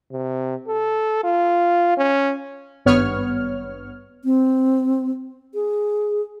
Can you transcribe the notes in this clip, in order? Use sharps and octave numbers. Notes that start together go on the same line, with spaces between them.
C3
A4
F4
C#4
G#1 G2 B3 C#5 F6
C4
G#4